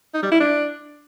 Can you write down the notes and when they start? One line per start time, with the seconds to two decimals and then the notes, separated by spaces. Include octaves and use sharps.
0.14 D#4
0.23 G3
0.32 E4
0.40 D4